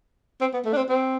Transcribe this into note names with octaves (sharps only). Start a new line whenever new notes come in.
C4
B3
A3
D4
C4
C4